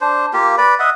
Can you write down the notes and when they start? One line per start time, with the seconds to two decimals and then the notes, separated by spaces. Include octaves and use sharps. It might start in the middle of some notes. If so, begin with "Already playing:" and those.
0.01 D4 C5
0.33 A#3 F4 G4
0.58 B4 D5 B5
0.79 D#5 E5 F#5